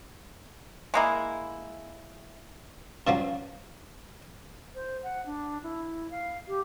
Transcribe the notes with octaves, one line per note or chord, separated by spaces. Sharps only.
G#3 A#3 E4
G2 C#3 F3 F#3
C5
F#5
D4
E4
F5
G4